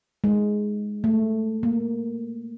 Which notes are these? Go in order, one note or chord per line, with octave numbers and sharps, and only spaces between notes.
G#3
A3
A#3